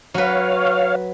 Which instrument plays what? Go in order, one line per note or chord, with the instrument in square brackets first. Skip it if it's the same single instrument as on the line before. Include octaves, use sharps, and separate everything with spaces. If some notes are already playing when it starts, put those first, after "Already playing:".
[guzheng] F#3 B4 [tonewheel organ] C#5 F5